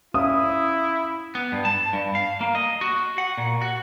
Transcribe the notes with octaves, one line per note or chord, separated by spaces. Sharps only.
C#4 E4 E5 F5 D#6
B3
G2
A5
G2
F5
A#3
D#5
F#4
F#5
A#2
F#4